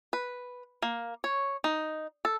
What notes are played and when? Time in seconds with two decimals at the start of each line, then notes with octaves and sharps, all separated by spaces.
0.13 B4
0.82 A#3
1.24 C#5
1.64 D#4
2.25 A4